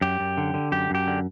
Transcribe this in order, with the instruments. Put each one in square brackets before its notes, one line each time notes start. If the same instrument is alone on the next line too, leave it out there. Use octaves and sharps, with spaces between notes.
[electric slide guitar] F#2 G4
F#2
D3
D3
F#2 G4
F#2 G4
D3